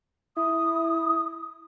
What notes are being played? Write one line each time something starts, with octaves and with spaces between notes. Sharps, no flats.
E4 D#6